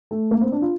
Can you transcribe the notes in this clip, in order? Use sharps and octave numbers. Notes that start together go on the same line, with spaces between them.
A3
A#3
C4
D4
F4